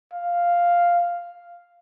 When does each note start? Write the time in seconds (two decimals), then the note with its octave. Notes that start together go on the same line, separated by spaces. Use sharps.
0.13 F5